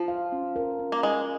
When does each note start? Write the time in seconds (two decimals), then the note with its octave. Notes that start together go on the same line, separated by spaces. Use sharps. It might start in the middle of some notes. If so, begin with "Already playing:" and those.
Already playing: F3 F4
0.08 F5
0.32 C#4
0.56 A#4
0.79 C#4
0.92 A#3
1.03 G#3 A#4